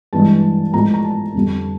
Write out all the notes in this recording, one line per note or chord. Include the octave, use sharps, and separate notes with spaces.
G2 E3 G#3 A5
A2 F3 G#3 A#5
A#5
A5
F2 D3 G3